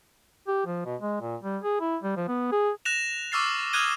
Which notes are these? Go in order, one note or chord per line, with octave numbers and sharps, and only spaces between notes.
G4
F3
B2
G#3
A#2
G3
G#4
E4
G3
F3
B3
G#4
F#6 A#6 E7 F7
C#6 D6 E6 F6 A6 C7
D#6 F6 F#6 G#6 D#7 G7